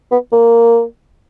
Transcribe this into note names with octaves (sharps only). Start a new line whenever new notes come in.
B3
A#3